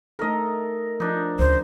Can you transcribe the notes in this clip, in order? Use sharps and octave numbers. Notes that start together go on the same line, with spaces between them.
A3 D#4 A4 A#4 D#5
F3 D4 D#4
D2 C#3 C5